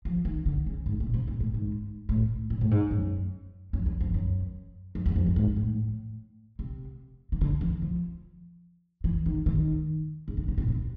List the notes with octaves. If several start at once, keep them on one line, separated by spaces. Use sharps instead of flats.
F3
D#3
D3
C#3
G#2
A#2
C3
A#2
A2
G#2
A2
A#2
A2
G#2
F#2
F#2
E2
F2
F#2
F2
E2
F2
G2
G#2
A2
C3
D#3
D3
E3
F3
E3
D#3
D#3
C#3
D3
C3
B2
C3